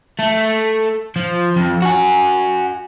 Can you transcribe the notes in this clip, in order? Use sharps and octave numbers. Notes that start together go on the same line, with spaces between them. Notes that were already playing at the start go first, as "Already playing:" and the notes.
A3
F3
F2
F#4 G#5